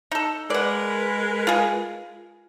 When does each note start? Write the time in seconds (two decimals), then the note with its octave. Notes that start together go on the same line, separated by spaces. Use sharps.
0.11 D#4 A4
0.50 G#3 A#4 B4 D5 F#5
1.47 F4 G#4